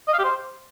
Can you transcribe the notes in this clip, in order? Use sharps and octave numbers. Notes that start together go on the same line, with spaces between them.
D#5
F5
G4
C5